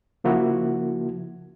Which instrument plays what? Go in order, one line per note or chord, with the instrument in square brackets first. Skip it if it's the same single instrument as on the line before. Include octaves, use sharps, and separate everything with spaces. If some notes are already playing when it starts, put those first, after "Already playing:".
[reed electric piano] C#3 F3 A#3 E4 F#4